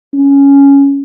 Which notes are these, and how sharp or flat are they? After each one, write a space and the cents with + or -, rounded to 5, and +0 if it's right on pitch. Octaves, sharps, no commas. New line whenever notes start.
C#4 +5